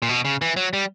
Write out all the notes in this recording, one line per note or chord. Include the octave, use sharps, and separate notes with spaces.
A#2
B2
C#3
E3
F#3
G3